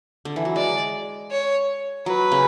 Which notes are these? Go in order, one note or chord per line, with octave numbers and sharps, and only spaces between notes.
D3
E3
F#3
G#3 D5
C#5
F#3 B4
C#3